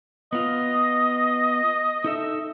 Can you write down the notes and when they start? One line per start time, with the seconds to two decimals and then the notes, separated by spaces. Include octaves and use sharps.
0.33 B3 F4 D#5
2.04 D#4 A4 E5